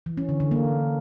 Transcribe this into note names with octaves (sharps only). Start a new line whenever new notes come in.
E3
C#4
D3
D3
A#3